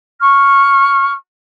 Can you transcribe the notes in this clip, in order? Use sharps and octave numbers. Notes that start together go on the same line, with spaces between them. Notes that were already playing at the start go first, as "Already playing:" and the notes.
C#6 F6